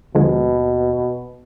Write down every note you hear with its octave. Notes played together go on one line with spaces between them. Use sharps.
D#2 B2 D3 F3 G#3